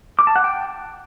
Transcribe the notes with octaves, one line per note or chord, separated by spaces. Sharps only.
D6
A5
F#5
G5